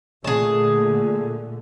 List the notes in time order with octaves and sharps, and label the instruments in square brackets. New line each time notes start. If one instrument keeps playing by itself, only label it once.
[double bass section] A#2 D3 A3 [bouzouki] G#4 A5